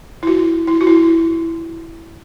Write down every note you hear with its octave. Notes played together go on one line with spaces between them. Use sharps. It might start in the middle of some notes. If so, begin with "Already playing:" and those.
E4
F#4
E4
F#4
E4